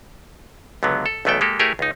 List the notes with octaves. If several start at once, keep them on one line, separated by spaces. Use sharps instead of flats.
C#2 D3 F#3 B3
A4
B1 E2 A3 B3 A4 G5
G#3 A#3 G4 A4
A3 E4 G4 G#4 A#4 C#5
C#2 D#4